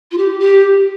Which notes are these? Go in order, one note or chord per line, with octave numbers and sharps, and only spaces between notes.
F4
G4
G4